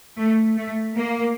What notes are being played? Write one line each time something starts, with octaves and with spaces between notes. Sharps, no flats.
A3
A3
A#3